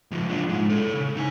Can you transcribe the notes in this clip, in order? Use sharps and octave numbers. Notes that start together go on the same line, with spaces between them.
C#2 F3
D4 F4
G#3 D#4
A4 C#5
C#3
D#4 G#5